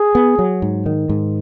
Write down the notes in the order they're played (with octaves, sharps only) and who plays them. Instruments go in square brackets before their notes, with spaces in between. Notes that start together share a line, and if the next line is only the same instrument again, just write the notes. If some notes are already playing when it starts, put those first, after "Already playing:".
Already playing: [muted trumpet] G#4
[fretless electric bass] B3
F#3
G#2
D#3
G#2